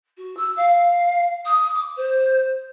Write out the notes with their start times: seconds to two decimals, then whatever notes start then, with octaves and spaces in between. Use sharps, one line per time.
0.18 F#4
0.37 E6
0.56 F5
1.45 D#6
1.74 D6
1.96 C5